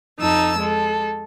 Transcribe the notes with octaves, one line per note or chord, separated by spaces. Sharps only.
F2 D#4 A5 E6
G#3 A4